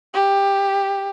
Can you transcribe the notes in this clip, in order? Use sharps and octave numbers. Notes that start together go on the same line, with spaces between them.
G4